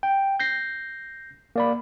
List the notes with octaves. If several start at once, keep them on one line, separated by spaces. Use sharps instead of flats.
G5
G6 A#6 C7
A#3 D5 B5